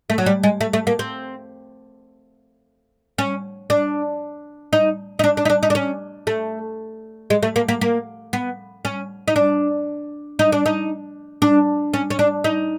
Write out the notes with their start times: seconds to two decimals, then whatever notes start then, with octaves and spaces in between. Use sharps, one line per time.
0.10 A3
0.18 F#3
0.26 G3
0.43 G#3
0.61 A3
0.73 A3
0.87 A#3
0.99 C4
3.18 C#4
3.70 D4
4.73 D#4
5.19 D#4
5.24 D4
5.37 D4
5.45 D#4
5.50 D4
5.63 D#4
5.70 D4
5.75 C#4
6.27 A3
7.30 G#3
7.43 A3
7.56 A#3
7.68 A#3
7.81 A#3
8.33 B3
8.85 C#4
9.28 D#4
9.36 D4
10.39 D#4
10.52 D4
10.66 D#4
11.42 D4
11.94 C#4
12.10 C#4
12.19 D4
12.44 D#4